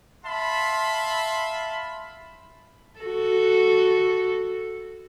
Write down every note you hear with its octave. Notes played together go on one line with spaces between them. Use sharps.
E5 F5 A5 B5 C6
F#4 A4